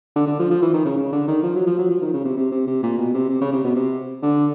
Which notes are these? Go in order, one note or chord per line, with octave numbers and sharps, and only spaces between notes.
D3
D3
F3
F3
E3
D#3
C#3
C#3
D3
D#3
F3
F#3
F3
F#3
F3
D#3
C#3
C3
C3
C3
C3
A#2
B2
C3
C3
C#3
C3
B2
C3
D3